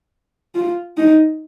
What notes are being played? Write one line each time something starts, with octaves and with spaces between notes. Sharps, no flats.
F4
D#4